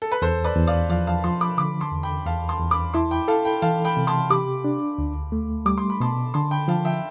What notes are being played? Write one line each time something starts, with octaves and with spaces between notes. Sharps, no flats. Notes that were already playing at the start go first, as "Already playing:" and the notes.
A4
B4
E2 A4 C5
B4 D5
E2
D5 F5
F3 D5 F5
F5 A5
F3 A5 C6
B5 D6
D3 B5 D6
A5 C6
E2
G5 B5
E2 F5 A5
A5 C6
E2
B5 D6
E4 A5 C6
G5 B5
A4 F5 A5
G5 B5
E3 F5 A5
G5 B5
C3
A5 C6
G4 B5 D6
D4
D2
A3
G3 D6
C6
B5
B2 A5 C6
D3 A5 C6
G5 B5
F3 F5 A5
E5 G5